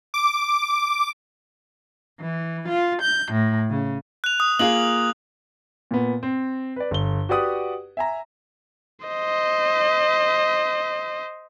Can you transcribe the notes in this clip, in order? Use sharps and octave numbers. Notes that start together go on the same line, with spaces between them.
D6
E3
F4
G6
A2
C#3
F#6 F7
D#6
A#3 F4 G#4 F#7
A#2 B3
C4
B4 D5
G1 G7
F#4 G4 B4 D5 F#5 D#6
E5 G#5 A#5
C5 D#5